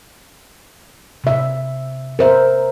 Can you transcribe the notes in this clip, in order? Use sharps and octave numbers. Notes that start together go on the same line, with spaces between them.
C3 E5
A#4 C5 E5